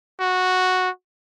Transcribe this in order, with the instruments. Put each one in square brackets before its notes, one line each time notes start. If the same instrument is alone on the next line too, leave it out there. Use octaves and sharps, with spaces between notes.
[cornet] F#4